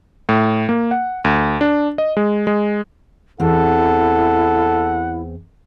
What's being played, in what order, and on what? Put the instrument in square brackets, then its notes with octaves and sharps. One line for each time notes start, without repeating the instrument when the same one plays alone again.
[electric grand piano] A2
A#3
F#5
D2
D4
D#5
G#3
G#3
[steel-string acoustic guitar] E2 C4 [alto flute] E4 [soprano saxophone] A4 [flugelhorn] F#5